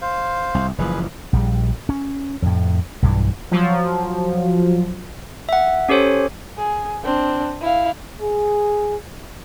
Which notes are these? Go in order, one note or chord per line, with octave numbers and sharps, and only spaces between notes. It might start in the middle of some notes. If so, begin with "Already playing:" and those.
C5 F5
C2
F#1 E3 F3 G#4 B4
A#1 G3
C#4
F2 A2
B1 G2 E3
F3 F#3
E5 F#5
C#4 G4 A4 C5 C#5
G#4
C4 D4
E4 F5
G#4